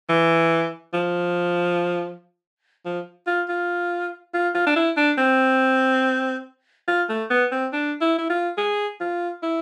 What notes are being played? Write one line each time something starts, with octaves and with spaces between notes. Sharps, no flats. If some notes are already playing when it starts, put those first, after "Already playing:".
E3
F3
F3
F4
F4
F4
F4
D4
E4
D4
C4
F4
A3
B3
C4
D4
E4
E4
F4
G#4
F4
E4